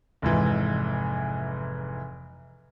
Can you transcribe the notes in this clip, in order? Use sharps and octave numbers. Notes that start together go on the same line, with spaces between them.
F1 G#2 E3